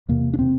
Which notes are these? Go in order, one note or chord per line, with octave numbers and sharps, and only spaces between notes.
E2 C3 A#3
D4
C3 C4